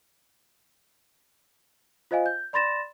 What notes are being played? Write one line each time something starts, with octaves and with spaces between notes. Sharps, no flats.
F4 C5 D#5 F5 G#5
G6
D5 B5 C6 A6 A#6 E7